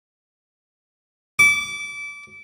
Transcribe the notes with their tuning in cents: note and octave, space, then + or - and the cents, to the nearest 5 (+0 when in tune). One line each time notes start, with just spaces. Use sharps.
D6 -25